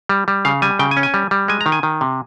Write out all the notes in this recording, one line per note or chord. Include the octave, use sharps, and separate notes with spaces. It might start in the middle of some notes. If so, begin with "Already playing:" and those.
G3
G3
C#3 F5
G3 G#5
C#3 G5
G#5
C#4
G#5
G3
G3
G#3 G#5
A#5
D#3
G#5
D#3
C3